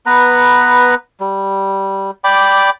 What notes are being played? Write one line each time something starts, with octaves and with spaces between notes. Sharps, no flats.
B3 B4 A#5
G3
D5 G5 B5 D6